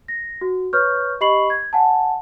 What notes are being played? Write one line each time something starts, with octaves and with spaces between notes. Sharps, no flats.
A#6
F#4
B4 C#5 C#6 F6 G6
G4 D#5 B5 C#6 C7 F#7
G#6
F#5 G#5 A5